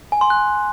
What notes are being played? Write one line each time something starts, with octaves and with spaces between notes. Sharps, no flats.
G#5
C6
F#6